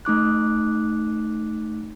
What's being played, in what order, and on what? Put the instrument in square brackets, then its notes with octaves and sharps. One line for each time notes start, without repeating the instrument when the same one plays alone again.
[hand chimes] A3 D#4 D6 F#6